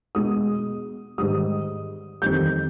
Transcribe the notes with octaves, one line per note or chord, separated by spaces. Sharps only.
B2 G#3 D#6
G#2 D#3 G3 D#6
F2 D#3 G3 G6